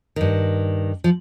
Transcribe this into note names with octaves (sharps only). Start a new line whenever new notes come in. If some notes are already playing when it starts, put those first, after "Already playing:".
G2 D#3
F3